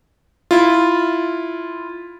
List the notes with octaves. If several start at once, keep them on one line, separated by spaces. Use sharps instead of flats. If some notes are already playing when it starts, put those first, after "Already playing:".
E4 F4